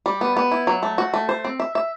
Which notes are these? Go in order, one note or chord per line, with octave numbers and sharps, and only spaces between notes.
G3
B3
B3
E4
F#3
A3
F#4
A3
C5
C4
E5
E5